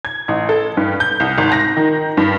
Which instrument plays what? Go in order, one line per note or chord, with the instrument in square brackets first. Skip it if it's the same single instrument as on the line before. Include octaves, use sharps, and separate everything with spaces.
[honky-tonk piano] G#6
A1
A4
G2
G6
C2
G#1
A#6
D#3
G2